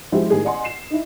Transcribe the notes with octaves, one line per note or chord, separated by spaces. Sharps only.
F3 G#3 E4 F#4 G4 C5
A2 D#3 G4 G#4
D5 D#5 F#5 G#5 C6
C7 E7
D#4 E4